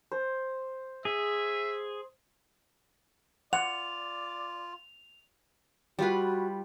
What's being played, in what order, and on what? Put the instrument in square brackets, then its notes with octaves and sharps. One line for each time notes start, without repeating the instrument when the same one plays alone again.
[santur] C5
[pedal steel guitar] G#4 [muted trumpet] E5
[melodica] F4 [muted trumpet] D5 [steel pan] F#5 [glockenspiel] F7
[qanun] G3 F4 B4 [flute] F#4